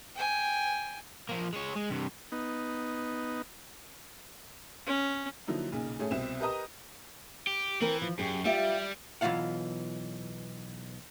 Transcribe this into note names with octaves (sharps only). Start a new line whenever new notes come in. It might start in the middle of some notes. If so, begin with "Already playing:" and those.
G5 G#5
F3 A#3
G#3 C#5
G#3
G2 C3
B3 D#4
C#4
D3 F3 F#3 A#3 D#4 E4
B1 A#2 C#3
A2 A3 C#4 G#4
C2 B2 C4 E5 E7
G4 A#4 B4 D#5 A#5 D#6
G4
E3 C4 A#4
F3
F#2 G4 G#4
G3 F4 G4 E5
B1 E3 F#3 F4 F5 F#5